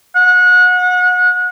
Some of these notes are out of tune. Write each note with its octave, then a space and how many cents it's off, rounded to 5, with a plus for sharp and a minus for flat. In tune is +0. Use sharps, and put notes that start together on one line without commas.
F#5 -30